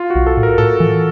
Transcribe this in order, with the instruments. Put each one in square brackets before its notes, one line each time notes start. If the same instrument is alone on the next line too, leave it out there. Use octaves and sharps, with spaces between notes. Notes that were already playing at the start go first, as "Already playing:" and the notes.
Already playing: [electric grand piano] F4
F#4
[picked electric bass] B1
[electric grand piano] A4
[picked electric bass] A2
[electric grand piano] A#4
[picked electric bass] A2 [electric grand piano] A4
[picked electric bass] E3